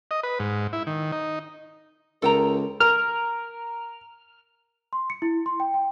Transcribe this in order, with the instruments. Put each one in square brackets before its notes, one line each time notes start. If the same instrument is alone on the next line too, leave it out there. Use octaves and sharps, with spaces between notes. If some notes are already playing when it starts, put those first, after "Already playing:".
[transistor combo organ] D#5
B4
G#2
E4
D#3
D#4
[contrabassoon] C#2 [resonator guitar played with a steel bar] A4 G5 A#5 [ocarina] A#4
[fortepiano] A#4 [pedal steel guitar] F6
[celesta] C6
C#7
E4
C6
G5
G5